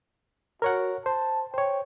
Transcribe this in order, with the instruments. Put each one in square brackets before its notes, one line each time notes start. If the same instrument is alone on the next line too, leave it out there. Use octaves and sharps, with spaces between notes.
[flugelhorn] F#4 [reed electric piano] A#4 C#5 F#5
[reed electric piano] C5 [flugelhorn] A5
[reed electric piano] C5 C#5 [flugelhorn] G5